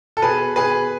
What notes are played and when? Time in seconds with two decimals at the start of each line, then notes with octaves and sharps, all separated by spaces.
0.17 A4
0.22 B2 G#4 B4
0.56 B2 G#4 B4